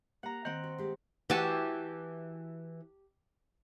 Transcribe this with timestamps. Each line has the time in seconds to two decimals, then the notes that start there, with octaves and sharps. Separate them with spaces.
0.23 A#3 G4 F#5 A#5
0.45 D#3 C4 F#5
0.64 F#4
0.78 G#3 G4
1.30 E3 F#4 G4 A5